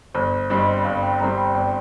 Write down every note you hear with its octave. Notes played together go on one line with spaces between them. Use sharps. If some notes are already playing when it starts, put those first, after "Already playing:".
G1 C5
G2 G3 C4 C5
D#5
C5
G1 F5
G5
G2 G3 C4 A#5
G5
G1 G5